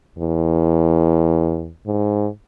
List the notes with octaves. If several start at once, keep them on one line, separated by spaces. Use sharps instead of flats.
E2
G#2